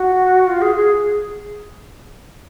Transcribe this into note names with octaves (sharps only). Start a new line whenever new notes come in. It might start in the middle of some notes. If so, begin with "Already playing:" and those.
Already playing: F#4
F4
G#4
G#4